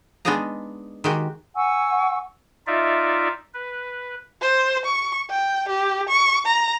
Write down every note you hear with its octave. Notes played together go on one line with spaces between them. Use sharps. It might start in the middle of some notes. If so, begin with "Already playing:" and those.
G#3 B3 D4 D#4 G#4 A#5
D#3 G#3 F#4 G4
F#5 G#5 C#6 E6
D#4 F4 D5 E5
B4
C5
C#6
G5
G4
C#6
A#5